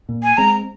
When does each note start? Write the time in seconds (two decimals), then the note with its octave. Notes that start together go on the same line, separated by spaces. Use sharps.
0.09 A#2
0.23 G#5
0.37 G#3 C4 A#5